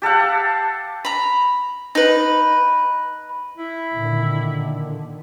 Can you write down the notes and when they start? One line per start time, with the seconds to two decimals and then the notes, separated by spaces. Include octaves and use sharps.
0.02 G4 A4 F5 F#5
1.05 A#5 B5
1.95 D#4 B4
3.57 E4
3.94 A#2 D3 D#3